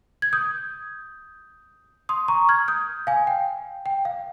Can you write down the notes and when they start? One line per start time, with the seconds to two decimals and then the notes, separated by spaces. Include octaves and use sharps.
0.22 G#6
0.33 D#6 G6
2.09 C6 D#6
2.28 A#5 C#6
2.49 F6 G#6
2.68 D#6 G6
3.07 F5 G#5
3.27 G5
3.86 G5
4.05 F5